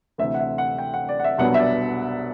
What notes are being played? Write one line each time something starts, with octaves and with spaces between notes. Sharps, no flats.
D2 C3 E3 E5
F#5
E5
F#5
G5
F#5
D5
F#5
E5
C2 B2 F#3 B3 D4 F#5
E5
D5